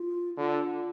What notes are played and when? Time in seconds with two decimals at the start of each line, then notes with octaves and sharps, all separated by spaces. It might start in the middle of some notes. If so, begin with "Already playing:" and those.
Already playing: F4
0.37 D3 F4